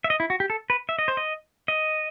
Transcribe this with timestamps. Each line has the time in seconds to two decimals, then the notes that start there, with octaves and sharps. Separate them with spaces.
0.04 E5
0.10 D#5
0.20 E4
0.30 F#4
0.40 G4
0.50 A4
0.70 B4
0.89 E5
0.99 D#5
1.08 C5
1.17 D#5
1.68 D#5